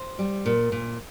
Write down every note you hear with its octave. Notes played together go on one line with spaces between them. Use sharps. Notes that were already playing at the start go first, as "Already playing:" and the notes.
Already playing: C5
G3
A#2
A#2